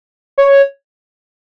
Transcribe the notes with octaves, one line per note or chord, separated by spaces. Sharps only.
C#5